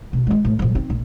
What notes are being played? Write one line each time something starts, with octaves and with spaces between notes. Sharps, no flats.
B2
E3 G#3
A2
A#2 F3
C4 D#4
A#1